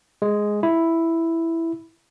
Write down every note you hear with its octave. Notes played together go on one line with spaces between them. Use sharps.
G#3
E4